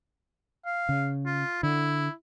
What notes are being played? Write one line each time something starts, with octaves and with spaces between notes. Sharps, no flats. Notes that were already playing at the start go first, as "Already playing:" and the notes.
F5
C#3
F4
D3 E4